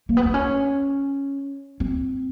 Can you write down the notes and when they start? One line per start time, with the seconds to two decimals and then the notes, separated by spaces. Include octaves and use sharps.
0.09 A#3
0.17 B3
0.25 C4
0.34 C#4
1.80 C4